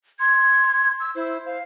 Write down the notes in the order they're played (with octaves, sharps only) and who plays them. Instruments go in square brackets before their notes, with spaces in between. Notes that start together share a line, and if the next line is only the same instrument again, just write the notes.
[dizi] C6 [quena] G#6
[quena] E6
[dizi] E4 [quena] C5
[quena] C5 [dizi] F5